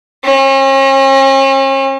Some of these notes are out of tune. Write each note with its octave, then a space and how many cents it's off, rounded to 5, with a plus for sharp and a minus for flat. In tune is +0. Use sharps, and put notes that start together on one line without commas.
C#4 -40